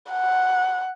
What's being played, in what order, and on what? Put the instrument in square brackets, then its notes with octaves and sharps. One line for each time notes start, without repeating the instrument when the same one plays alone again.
[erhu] F#5